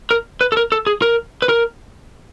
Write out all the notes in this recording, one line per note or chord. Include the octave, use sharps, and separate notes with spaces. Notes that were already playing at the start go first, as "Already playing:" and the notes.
A#4
B4
A4
A#4
A4
G#4
A#4
B4
A#4